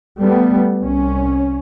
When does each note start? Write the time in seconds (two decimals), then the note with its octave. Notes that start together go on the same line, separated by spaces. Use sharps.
0.19 G3 A3 B3
0.80 C2 C#4